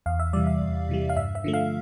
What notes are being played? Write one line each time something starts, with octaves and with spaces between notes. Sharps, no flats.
E2 F5
E5
C3 E3 G3 D5
E5
E2
C3 E3 G3
F5
G2 E5
E5
D3 F3 A3
F5